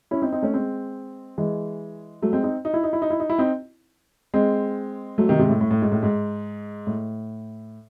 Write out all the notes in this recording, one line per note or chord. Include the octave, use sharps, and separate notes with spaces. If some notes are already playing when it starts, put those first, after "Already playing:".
C#4 E4
C4 D#4
C4 D#4
A3 C#4
G#3 C4
E3 G#3
F#3 A3
G#3 C4
C4 D#4
D#4
E4
D#4
E4
D#4
E4
D#4
E4
C4 D#4
G#3 C4
F#3 A3
C3 D#3
G#2 C3
A2
A2
A2
G#2
A2
G#2
A2